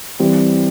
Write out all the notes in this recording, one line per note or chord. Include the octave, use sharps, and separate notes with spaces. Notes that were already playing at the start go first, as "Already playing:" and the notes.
E3 G3 C4